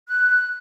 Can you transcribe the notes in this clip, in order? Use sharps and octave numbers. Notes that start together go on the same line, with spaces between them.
F#6